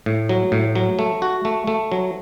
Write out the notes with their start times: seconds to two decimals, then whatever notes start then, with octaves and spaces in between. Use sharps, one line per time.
0.06 A2
0.29 F#3
0.52 A2
0.75 F#3
0.99 A3
1.22 F#4
1.45 A3
1.67 A3
1.92 F#3